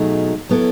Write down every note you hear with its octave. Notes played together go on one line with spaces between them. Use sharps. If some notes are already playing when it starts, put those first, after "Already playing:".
Already playing: B2 F#3 A3 D#4 G#4
F#3 B3 E4 A4